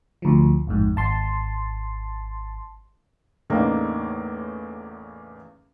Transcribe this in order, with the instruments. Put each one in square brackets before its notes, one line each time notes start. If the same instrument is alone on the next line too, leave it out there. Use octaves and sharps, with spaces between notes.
[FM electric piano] D2 F3
A1 F2 G#2
G#1 A5 C6
[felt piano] E2 A2 C#3 A#3 D4 D#4